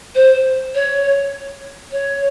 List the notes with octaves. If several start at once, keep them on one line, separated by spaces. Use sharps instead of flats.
C5
C#5
C#5